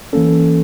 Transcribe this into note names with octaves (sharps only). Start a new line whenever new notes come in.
E3 A#3 C#4 A4